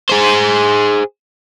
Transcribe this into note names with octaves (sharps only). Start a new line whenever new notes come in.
G#4 C5